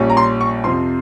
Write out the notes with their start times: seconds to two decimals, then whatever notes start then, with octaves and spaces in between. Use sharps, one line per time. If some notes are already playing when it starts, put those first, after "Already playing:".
Already playing: A#1 A#2 G3 C#4
0.10 A#5
0.17 C6
0.41 C#6
0.64 F2 C3 F3 C4 C6